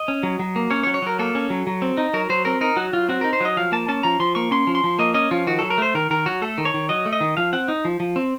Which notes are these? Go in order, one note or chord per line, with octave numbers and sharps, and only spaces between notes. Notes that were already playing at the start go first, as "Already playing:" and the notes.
Already playing: D#5
C#4
F#3
F#3
A#3
C#4 C#5
C#5
F#3
C#5
F#3 A#4
A#3 A4
C#4
F#3
F#3
C4
D#4
F#3 A#4
F#3 C5
C4 A#4
D#4 A#4
F#3 F#4
F#3 F4
C4 F#4
D#4 A#4
C5
F#3 D#5
F3 F5
A#3 A5
C#4 A5
F3 A#5
F3 C6
A#3 C#6
C#4 C6
F3
C6
F3
A#3 D#5
C#4 D#5
F3 F4
D#3 F#4
F#3 A4
A#4
A3 C5
D#3 A#4
D#3 A#4
F#3 F#4
A3 A4
D#3
C#5
D#3
F#3 D#5
A3
D#5
D#3
F3 F5
C4 F#5
D#4
F3
F3
C4